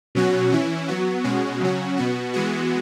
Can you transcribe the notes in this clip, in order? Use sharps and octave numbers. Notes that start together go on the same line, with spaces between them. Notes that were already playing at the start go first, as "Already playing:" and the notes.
B2 F#3 C#4 F#4
E3 C#4 E4
F#3 B3 F#4
B2 G#3 C#4 F#4
C#3 F#3 C#4 F#4
B2 B3 F#4
E3 G#3 B3 F#4